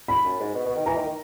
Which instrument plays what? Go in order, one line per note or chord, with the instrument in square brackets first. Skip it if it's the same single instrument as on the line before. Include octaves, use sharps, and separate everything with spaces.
[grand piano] B5
[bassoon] F#2
G#2
B2
B2
D#3
[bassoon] E3 [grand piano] A#5
[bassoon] D#3
D#3